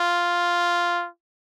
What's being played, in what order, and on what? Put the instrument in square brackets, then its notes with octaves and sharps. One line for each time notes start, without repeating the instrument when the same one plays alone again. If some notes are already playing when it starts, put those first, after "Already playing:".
Already playing: [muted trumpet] F4